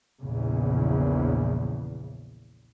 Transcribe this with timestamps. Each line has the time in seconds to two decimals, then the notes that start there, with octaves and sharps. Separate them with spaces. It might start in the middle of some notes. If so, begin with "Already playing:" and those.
0.22 A#1 E2 C#3